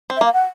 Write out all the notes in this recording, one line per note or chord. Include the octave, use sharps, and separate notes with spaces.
C4
E5
A#3
F5
F#5